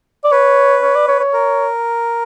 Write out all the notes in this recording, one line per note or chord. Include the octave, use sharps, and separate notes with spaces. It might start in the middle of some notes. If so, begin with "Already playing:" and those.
D5
B4 C#5
C#5
D5
C#5
C#5
A#4